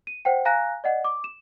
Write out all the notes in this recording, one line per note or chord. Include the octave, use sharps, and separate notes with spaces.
D#7
C5 F#5 G5
F5 G#5 A#5 F#6 A#6
D5 D#5 F#5
D6
E7